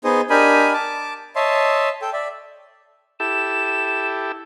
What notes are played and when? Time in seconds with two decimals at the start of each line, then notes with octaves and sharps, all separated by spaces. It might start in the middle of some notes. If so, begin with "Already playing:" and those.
0.04 B3 D#4 G#4 C5 D#5
0.30 D4 G4 A#4 D#5 G#5 B5
0.73 A5 D6
1.36 C#5 D#5 E5 A5 C6
2.02 A4 G5
2.13 D5 E5
3.20 E4 G4 A4 E7